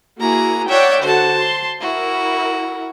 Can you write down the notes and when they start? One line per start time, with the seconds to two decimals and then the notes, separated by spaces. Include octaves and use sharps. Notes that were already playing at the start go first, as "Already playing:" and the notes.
0.20 A#3 E4 F#4 G#4 A#5
0.68 C#5 D5 E5 F#5 G5
1.02 D3 F#4 C5 F#5 A5
1.40 C6
1.81 E4 F#4 A#4